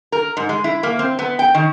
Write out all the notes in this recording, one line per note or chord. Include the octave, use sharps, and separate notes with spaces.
A#4
G#2
G#3
E4
A#3
C4
B3
G5
D#3